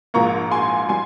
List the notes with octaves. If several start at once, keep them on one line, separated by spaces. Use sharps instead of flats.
A#1 G#2 F3 A#3 A#5 C#6
G#5 C6
G3 G#5 C6